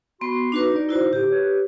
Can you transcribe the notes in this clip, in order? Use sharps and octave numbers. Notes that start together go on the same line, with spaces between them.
B3 F#4 C6
D4 D#4 F#4 B4
D5
E4 F#4 C5
A2 D3 G4
B4 C#5